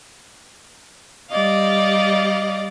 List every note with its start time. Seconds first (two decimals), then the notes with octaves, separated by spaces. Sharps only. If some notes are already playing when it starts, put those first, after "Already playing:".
1.30 G3 D5 D#5 F5